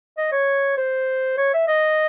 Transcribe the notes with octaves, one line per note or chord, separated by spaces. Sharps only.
D#5
C#5
C5
C#5
E5
D#5